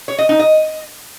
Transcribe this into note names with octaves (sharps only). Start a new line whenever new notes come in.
C#5
D#5
D#4
D#5